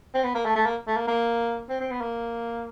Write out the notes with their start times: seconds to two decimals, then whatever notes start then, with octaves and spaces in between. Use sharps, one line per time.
0.14 C4
0.24 B3
0.35 A#3
0.45 A3
0.55 A3
0.66 A#3
0.87 A3
0.97 A#3
1.07 A#3
1.70 C4
1.81 C4
1.91 B3
2.01 A#3